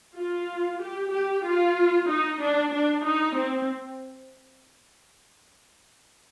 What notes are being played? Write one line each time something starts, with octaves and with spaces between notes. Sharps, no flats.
F4
G4
G4
F4
D#4
D4
D4
D#4
C4